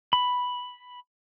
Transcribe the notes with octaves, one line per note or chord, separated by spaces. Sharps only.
B5